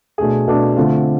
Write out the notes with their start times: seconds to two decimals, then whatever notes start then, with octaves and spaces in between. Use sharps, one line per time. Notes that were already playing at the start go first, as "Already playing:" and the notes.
0.18 B2 A3 D4 G#4
0.47 B2 A3 D4 G#4
0.77 D3 A3 C4 F4